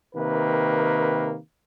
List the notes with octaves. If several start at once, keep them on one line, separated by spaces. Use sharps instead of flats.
C3 D#3 A#3 B4